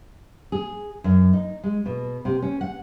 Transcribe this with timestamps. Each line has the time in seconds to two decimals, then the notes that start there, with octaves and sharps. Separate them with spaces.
0.52 G#4
1.04 F#2
1.33 D#4
1.64 G#3
1.86 B2
2.25 C3
2.42 C#4
2.61 F#5